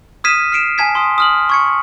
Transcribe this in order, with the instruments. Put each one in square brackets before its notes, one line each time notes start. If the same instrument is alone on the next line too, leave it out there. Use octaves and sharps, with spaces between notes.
[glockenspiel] D#6 F6 G#6 B6 D#7 E7
F6 C7 D7 E7
G#5 A5 G#6 B6
C6 D#6
D#6 F6 F#7
C#6 G#6 C#7